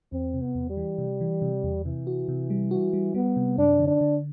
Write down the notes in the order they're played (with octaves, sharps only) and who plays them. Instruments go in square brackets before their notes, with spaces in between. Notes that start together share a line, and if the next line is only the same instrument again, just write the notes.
[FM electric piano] E2 [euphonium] C4
[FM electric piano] C3
[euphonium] B3
[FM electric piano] E2
[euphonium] G3
[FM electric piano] E3
C3
E3
C3
E2
[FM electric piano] C3 [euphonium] E3
[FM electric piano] F#4
C3
G3
[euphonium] E3 [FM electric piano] F#4
[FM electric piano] G3
[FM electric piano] G3 [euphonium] B3
[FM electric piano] C3
[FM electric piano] F#2 [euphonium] D4
[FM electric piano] D3
[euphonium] D4
[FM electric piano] D3